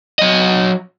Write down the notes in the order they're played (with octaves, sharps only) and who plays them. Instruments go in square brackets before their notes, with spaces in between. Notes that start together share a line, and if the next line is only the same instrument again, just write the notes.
[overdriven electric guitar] F#3 D#5